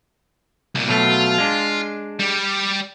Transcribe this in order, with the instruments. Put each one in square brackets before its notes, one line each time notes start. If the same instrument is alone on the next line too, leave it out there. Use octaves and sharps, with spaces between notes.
[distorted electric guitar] C2 A#2
[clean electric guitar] B2 F#3 A3 [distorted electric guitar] F4
[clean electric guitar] G#3 D4
[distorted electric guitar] G3 G4